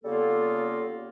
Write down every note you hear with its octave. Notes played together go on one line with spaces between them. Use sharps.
C#3 G3 A#3 B3 F4 A4